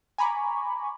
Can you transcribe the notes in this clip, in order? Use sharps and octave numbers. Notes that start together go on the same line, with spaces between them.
G#5 A#5 B5 C#6 D6